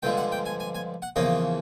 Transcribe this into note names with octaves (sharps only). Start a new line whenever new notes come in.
G2 D3 F3 G#3 G5
F#5
G5
G#5
G#5
G#5
F#5
E2 C#3 F3 A#3 C#4 D#5